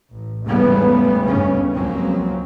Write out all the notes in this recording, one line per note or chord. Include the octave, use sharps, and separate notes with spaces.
A1
E2 G#2 C#3 G3 A3 B3
G1 D#2 C#3 C#4
C#2 F3 F#3 A#3 C4